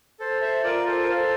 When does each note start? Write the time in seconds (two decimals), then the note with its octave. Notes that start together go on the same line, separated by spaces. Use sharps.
0.20 A4 C5
0.42 C5 E5
0.64 F4 A#4 D5
0.86 A4 C5
1.02 A#4
1.08 A4 C5